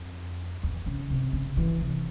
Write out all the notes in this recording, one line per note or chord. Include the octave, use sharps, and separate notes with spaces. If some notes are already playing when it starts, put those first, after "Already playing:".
Already playing: F2
E2
C#3
C3
C#3
E3
C3